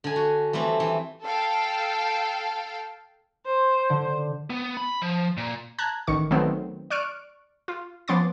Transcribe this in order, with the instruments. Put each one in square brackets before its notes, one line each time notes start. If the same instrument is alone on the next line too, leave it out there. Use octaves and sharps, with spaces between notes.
[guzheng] D3 G#5
F#4
E3 G3 A3 C4
E3
[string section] A4 F5 G5 A5
[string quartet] C5
[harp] D3
[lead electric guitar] B3
B5
F3
A#2
[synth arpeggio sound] A5 A#5 F#6 G#6
A1 D#3 C#6
D#3 F#3 A3 B3 C4
D5 C#6 F6 F#6 D7
F4
F3 B3 C#4 C6 D6 A6